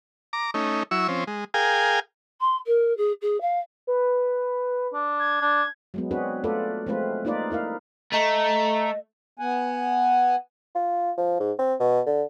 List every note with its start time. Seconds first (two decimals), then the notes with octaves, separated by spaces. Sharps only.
0.33 A#5 D6
0.54 A3 C#4 D#4
0.91 F#3 E4 C#6 E6
1.08 F3 C4 C#4
1.27 G#3
1.54 G#4 A#4 F5 G5 G#5
2.41 C6
2.66 A#4
2.97 G#4
3.21 G#4
3.41 F5
3.87 B4
4.94 D4
5.19 G#6
5.41 D4
5.94 F#3 G#3 B3
6.11 C4 D4 F#4 G#4 B4
6.44 A3 F4 A4 B4 D5
6.87 F3 G#3 A3 C4 F4 B4
7.25 A#3 D#4 F4 B4 D5
7.51 D#4 E4 A#4 F5
8.13 A3 D#5 A#5
9.39 B3 F#5 G#5
10.75 F4
11.18 F3
11.40 G#2
11.59 C4
11.80 B2
12.06 D3